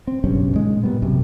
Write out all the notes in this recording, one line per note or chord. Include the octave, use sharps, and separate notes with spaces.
C4
F#1 B1 G2 C#4
A#2 D#3 G#3
A#2 G3 B3
A#1 F#2 C3